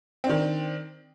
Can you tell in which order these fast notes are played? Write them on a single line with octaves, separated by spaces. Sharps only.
C4 D4 D#3